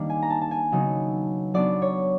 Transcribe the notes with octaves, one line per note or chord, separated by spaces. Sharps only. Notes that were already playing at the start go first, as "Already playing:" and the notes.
Already playing: D#3 G3 A#3 D4
G#5
A#5
A5
A5
G#5
C#3 F#3 B3 D#4
F#3 B3 D4 D5
C#5